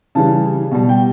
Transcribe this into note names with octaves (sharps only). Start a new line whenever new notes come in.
C#3 E3 G3 A5
B2 G3
G5